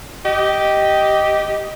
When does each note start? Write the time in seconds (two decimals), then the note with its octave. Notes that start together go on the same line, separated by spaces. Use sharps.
0.24 G4 D#5